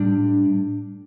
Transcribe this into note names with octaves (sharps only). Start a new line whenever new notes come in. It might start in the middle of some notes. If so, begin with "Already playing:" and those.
Already playing: A2 G3 D4